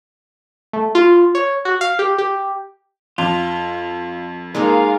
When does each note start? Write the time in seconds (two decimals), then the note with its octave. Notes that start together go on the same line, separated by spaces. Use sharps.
0.73 A3
0.95 F4
1.35 C#5
1.65 F#4
1.81 F5
1.99 G4
2.18 G4
3.18 F2 F4
4.55 G#3 A#3 D#4 F4 A#4 F5